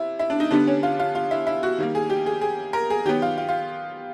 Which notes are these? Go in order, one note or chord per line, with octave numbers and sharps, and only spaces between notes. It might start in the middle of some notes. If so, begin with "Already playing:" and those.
Already playing: C3 E4
E4
D4
D#4
D3 G3 B3 D4
C#4
F4
F4
F4
E4
E4
F#4
D#3 G3 A#3
G#4
G4
G#4
G#4
A#4
G#4
D#3 F#3 B3 G4
F4
F4
F4